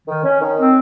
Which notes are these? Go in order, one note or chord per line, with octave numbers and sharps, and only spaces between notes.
D#3
C#4
D#3
C4